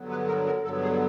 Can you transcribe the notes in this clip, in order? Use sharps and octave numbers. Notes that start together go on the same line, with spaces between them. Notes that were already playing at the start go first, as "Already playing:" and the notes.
Already playing: G2 D3 F#3 B3
B4
A#4
A#4
G2 D3 F#3 B3 A4
G#4